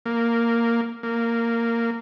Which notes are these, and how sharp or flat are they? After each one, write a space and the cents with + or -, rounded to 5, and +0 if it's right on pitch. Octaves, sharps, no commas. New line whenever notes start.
A#3 -5
A#3 -10